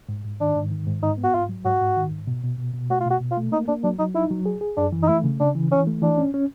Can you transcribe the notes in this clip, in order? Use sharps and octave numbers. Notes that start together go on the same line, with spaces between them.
G#2
G#2
D#3 D4
G#2
D#3
G#2
G#2 D#4
B3
F#4
G#2 F4
F#3
G#2 F#4
G#2
D#3
G#2
B2
B2
B2
B2
A3 F#4
F4
B2 F#4
B2
F4
A3
A#3 D#4
A#3 D4
F#3 D4
F#3 D#4
D#4 E4
F#3
G#4
G#4
F#2 D4
E3
D#4
A3 E4
C#3
C#3 D4
E3
E3 C#4
A3
E3 D4
C#4
C#4